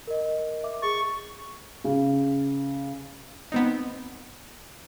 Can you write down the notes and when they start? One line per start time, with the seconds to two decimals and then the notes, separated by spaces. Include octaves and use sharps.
0.07 A#4 D#5
0.63 E5 D6
0.82 G#4 C#6 A6
1.84 C#3
3.52 B3 C4 D#4